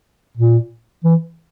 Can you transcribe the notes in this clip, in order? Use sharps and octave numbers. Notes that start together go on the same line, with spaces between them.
A#2
E3